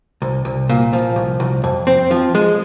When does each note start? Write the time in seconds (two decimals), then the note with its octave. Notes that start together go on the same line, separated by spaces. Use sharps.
0.22 C2
0.45 C2
0.69 A#2
0.93 F3
1.16 C2
1.40 C2
1.64 F2
1.87 C4
2.11 F3
2.35 G#3